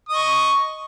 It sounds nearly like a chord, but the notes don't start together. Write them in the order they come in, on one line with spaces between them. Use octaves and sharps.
D#6 D#5 C#6